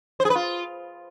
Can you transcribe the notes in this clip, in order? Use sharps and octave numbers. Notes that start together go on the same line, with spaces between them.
C5
G#4
B4
F4